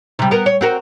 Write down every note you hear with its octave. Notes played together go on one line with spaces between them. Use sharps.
C3 G3
B3 A#4
C#5
C4 F#4 A#4